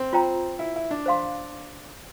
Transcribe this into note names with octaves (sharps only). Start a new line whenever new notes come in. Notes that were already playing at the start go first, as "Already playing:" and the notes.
Already playing: C4
F4 C5 G5 A#5
E4
E4
D4
C5 F5 C6